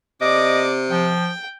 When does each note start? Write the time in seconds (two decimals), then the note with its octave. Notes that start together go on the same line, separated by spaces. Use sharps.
0.21 C3 D5 D#5 D6
0.91 F3 G5